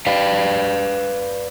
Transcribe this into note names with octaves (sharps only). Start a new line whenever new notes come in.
B4 D5 F5